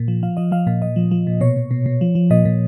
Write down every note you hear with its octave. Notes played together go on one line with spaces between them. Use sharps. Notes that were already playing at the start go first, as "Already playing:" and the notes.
Already playing: A#2
F3
F3 F5
F3 D#5
F3 F5
A#2 F5
A#2 D#5
F3
F3
A#2
B2 C#5
B2
B2
B2
F3
F3
A#2 D#5
A#2